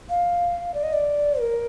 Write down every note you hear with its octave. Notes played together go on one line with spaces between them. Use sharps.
F5
D5
D#5
D5
A#4